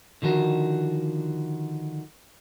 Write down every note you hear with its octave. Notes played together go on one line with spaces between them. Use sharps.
D3 D#3 F3 F#4 A#4